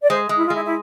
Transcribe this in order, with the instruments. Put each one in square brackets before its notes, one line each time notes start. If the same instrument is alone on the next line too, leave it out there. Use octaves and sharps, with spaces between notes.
[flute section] D5
[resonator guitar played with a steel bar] G#3 [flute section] C5
[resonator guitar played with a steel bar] G#3
[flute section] E4
F4
[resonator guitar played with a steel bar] G#3 [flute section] E4
[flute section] E4